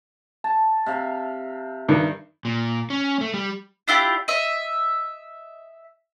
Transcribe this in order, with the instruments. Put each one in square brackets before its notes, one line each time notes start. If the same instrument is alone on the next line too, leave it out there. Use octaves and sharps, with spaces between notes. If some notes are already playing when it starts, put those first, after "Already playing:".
[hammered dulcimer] A5
C3 E5 F5
[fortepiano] G2 D#3
[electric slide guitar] A#2
C#4
A3
G3
[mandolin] D4 E4 F4 G4
D#5 E5